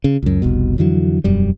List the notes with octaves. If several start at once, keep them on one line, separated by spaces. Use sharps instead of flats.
C#3
C#2 F#2
F1 C2 B2
F2 D3 E3 F#3
E1 F#2 G3